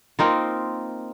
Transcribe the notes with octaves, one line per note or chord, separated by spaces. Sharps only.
A#3 C4 D#4 F4